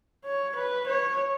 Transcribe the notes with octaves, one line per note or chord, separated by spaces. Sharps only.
C#5
B4
C#5